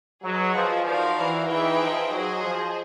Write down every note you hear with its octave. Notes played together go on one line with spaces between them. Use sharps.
F#3 G#4 B4 D#5
F3
F3 D#4 F#4 A#4 D5 F5
E3
E3 D#4 G#4 B4 E5 G5
F3
F#3 G#4 C5 D#5
F3